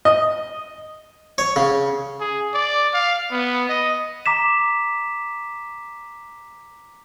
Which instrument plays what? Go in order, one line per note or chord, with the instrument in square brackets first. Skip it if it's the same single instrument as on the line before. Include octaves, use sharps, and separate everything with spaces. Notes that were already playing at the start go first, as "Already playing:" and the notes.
[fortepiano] D#5
[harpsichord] C#5
C#3
[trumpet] G#4
D5
F5
B3
D#5
[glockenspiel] A#5 D6 B6 E7